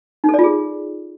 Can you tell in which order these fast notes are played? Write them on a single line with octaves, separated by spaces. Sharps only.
D#4 A4 D5 F4 G#4